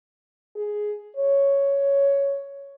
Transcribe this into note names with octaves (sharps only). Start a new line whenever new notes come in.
G#4
C#5